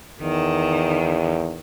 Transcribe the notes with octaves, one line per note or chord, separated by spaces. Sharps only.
E2 D#3